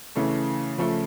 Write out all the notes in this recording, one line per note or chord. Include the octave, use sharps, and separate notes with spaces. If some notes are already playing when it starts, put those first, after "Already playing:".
C#3 E3 A3
C#3 F3 A3